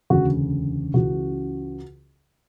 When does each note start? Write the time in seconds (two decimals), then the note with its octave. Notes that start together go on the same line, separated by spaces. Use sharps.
0.10 E1 D2 C#3 F#4
0.94 C#2 C#3 E3 F#4